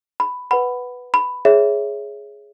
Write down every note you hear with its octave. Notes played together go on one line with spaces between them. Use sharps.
B5
B4 F#5 B5
B5
G#4 C#5 E5